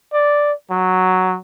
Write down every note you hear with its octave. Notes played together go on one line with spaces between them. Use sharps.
D5
F#3